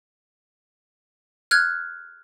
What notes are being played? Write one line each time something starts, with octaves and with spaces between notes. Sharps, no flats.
F6 F#6 G#6